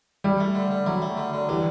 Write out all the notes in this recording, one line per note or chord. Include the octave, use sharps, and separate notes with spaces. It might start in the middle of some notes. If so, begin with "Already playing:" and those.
G3 E4
A3
D3
D3
F#3 E4
A3
D3
D3
E3 G3